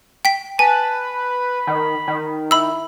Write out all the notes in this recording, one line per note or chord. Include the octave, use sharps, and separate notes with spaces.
G5 B6
B4 G#5 A5
B5
D#3
D#3
E4 B5 E6